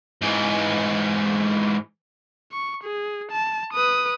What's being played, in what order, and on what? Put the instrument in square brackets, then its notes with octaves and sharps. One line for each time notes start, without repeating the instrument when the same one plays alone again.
[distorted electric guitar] G#2 E3
[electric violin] C#6
G#4
A5
B4 D#6